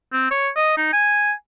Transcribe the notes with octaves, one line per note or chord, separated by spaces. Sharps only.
C4
C#5
D#5
D#4
G#5